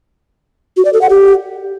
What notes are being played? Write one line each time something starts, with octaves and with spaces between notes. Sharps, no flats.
F#4
D5
A4
F#5
G4